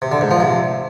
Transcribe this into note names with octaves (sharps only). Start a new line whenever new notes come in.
C3
D3
G#2
F3
C3